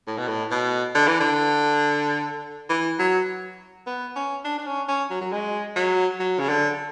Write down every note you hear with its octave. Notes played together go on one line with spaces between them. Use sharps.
A2
B2
A2
B2
D3
E3
D3
E3
F#3
B3
C#4
D4
D4
C#4
C#4
F#3
F#3
G#3
F#3
F#3
C#3
D3